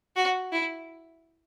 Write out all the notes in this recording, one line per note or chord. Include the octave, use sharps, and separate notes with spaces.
F#4
E4